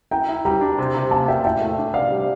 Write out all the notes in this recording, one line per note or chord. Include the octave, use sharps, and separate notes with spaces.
E4 G5 A#5
E4
G3 G5 A#5
D4
C3
C3
A#3 F5 A5
F4 E5 G5
A2 E5 G5
A3
D4
C3 D5 F5
G3